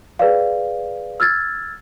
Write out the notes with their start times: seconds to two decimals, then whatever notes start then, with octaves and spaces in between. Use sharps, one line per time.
0.19 G#4 B4 D5 F5
1.20 E6 F6 G#6 A6